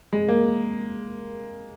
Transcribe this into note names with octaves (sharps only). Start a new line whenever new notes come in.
G#3
A#3